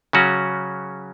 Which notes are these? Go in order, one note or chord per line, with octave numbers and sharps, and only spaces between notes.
C#3 F#3 C#4 F#4